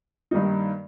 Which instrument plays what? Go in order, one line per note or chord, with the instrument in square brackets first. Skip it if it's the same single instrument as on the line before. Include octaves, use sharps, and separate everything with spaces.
[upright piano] G2 D#3 G3 A#3 D#4